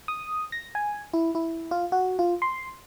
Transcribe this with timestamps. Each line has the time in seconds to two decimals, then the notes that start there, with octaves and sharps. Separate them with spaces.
0.08 D#6
0.52 A#6
0.75 G#5
1.14 E4
1.35 E4
1.71 F4
1.92 F#4
2.19 F4
2.42 C6